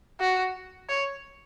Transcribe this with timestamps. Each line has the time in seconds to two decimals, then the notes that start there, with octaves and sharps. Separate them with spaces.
0.20 F#4
0.89 C#5